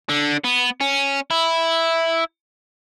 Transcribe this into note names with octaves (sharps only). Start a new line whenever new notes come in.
D3
B3
C#4
E4